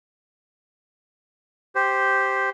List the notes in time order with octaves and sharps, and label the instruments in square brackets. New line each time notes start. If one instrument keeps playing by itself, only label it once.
[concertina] G4 C5